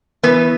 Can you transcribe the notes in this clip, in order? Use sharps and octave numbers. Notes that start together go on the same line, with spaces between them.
E3 B3 B4